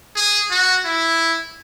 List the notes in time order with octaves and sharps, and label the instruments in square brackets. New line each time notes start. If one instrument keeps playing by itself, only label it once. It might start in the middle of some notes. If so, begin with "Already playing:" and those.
[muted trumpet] G#4
F#4
E4